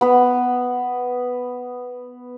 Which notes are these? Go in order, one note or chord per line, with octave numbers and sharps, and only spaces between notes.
B3 B4